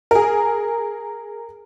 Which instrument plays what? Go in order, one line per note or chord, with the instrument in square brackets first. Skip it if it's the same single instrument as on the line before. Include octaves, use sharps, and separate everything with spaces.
[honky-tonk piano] G#4 A#4